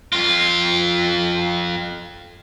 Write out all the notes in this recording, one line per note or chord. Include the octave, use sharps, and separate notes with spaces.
F2 F4